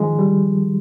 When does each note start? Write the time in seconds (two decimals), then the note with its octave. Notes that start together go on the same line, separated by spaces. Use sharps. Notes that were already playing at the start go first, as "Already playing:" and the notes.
Already playing: D#3 F3 G#3
0.19 G3